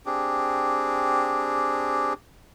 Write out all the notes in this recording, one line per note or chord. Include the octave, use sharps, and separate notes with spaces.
C4 D4 G4 G#4